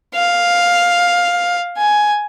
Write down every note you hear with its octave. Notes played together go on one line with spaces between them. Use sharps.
F5
G#5